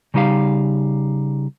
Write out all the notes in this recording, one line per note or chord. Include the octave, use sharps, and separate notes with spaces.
C#3 G3 D#4 G4 F5